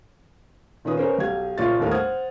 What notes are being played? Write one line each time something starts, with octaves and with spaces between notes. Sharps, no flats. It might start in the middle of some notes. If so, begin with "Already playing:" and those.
A#2 D#3 C#4 B4 D#6
B3 C#4 A#4 C5
B1 G4 F5 G#6
F#1 A#2 F4 C#5 C#6 A6
G1 D#2 A2 A#4 F5
C5 F#5 D#6 F6 G#6